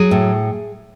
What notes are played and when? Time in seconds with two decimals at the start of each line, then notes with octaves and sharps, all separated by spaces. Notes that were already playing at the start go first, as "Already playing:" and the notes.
Already playing: F#3 G#4
0.11 A2